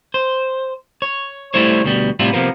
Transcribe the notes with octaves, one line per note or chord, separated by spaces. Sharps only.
C5
C#5
G3 A3 E4 C5 C#5
D2 B2 G3
A2 C3 G3 E4 F4
C3 F3 A#3 B3